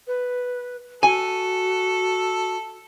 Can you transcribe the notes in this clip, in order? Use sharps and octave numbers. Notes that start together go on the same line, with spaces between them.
B4
F#4 A4 G#5